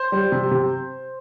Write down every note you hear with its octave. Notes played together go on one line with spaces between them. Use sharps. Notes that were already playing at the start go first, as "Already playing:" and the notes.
Already playing: C5
G3
C3
C3